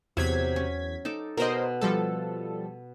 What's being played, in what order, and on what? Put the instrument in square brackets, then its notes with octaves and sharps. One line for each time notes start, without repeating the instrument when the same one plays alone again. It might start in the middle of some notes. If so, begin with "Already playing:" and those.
[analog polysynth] E2 G#6 B6 [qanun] C3 F#3
[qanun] C#4
D#4 A4 D6
[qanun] B2 D5 [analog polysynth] A#4 C5 D#5
[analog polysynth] F3 G3 A4